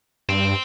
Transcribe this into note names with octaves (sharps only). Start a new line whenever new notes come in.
G2 C4